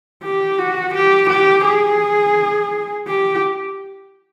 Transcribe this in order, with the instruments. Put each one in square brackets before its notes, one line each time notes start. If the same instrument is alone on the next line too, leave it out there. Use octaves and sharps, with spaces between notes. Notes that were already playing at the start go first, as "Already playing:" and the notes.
[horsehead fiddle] G4
F#4
G4
G4
G#4
G4